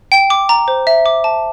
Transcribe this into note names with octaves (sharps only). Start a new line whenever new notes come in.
G5
D6
A#5
C5
E5
D6
A5